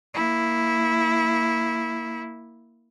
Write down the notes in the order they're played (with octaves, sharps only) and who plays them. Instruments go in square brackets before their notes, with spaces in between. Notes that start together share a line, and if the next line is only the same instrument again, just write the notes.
[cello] A#3 E4